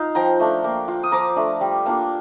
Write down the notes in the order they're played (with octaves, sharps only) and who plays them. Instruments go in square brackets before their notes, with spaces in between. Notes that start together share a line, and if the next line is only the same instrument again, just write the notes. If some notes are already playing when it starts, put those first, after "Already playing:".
Already playing: [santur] D#4 F4 F5
F3 G5 A#5
A3 D4 F4
A#3
F4
D#6
F3 A#5 D6
A3 D4
G3
A#3 D4 F4